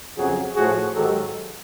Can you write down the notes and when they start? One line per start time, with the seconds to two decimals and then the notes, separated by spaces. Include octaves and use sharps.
0.16 F2 C#3 F#3 F#4 G#4
0.55 A2 F3 F#4 G#4
0.94 G#2 D#3 F#3 G4 A4